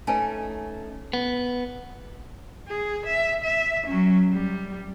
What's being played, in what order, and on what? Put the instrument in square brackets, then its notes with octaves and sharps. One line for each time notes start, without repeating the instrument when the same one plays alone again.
[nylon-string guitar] A3 C#4 D#4 [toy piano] B4 G#5 A5
[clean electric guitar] B3
[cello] G#4
E5
E5
F#3 C#4
G3